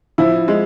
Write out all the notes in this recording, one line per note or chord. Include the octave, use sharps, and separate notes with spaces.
F3 E4
G#3